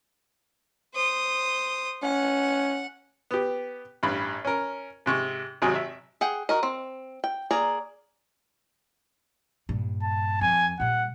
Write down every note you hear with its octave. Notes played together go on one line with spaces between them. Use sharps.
C5 D#6
C#4 F#5
B3 G4
A1 G2 B5
C#4 A#4
G#2 C3 C#6
G#1 C3 F#3 G#4 G#5
E5
G#4 F#5 G5
F#4 A#4 D#5
C4
G5
A#3 G#4 D5 A#5
G2 A#2
A5
F2 G#5
A#2 G3 F#5